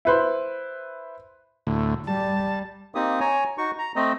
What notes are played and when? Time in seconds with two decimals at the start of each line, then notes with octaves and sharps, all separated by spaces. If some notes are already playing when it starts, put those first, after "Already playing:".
0.05 E4 B4 C5
1.67 D2 A2
2.07 G3 A5
2.95 A#3 C4 D#4 G4 D#6
3.20 C#5 G#5 A#5
3.58 D#4 F#4 C#6
3.79 A#5
3.96 A3 C4 D#5